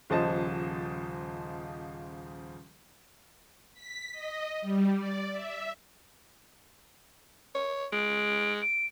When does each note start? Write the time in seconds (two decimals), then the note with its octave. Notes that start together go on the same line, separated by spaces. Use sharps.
0.10 D#1 C#3 F3 C5 D#5 A5
3.74 B6
4.12 D#5
4.61 G3
4.95 D5
5.32 E5
7.55 C#5
7.92 G#3 D7
8.62 D7